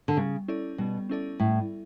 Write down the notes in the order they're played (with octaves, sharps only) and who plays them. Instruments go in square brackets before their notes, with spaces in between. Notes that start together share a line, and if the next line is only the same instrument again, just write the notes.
[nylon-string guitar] D3
[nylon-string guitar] C#3 [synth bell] G3
[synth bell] C#4 E4 A4 D5
[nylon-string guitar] B2 [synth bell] G3
[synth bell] C#4 E4 A4 D5
[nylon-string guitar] A2 [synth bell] G3